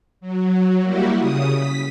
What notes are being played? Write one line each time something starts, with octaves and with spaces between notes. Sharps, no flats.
F#3
G3 A#3 E4 F#4 G4
C#3 D#6
B6